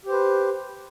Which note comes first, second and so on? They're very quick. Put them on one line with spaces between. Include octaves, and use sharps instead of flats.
G4 C5 B4